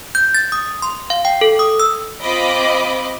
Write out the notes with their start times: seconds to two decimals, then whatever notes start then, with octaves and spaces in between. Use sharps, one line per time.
0.15 G6
0.35 A6
0.52 D#6
0.82 C6
1.10 F5
1.25 G5
1.41 A4
1.59 D#6
1.80 E6
2.20 C4 F4 D#5 B5 D6